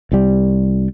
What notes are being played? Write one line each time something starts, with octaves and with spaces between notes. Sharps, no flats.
C2 G3